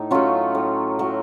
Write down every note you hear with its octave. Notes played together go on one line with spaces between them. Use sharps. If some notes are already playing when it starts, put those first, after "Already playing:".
Already playing: A2 D#4
F#3 A3 C#4 F4
A2
F#3 A3